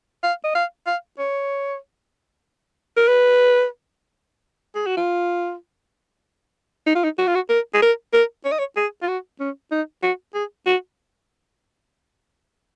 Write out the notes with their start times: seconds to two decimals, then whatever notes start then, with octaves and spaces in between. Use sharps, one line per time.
0.23 F5
0.44 D#5
0.55 F5
0.86 F5
1.19 C#5
2.97 A#4
3.08 B4
4.75 G#4
4.86 F#4
4.97 F4
6.86 D#4
6.95 F4
7.04 D#4
7.18 F#4
7.27 F4
7.35 F#4
7.50 A#4
7.74 G#4
7.82 A#4
8.13 A#4
8.45 C#5
8.52 D#5
8.59 C#5
8.77 G#4
9.02 F4
9.08 F#4
9.40 C#4
9.72 D#4
10.02 F#4
10.34 G#4
10.66 F#4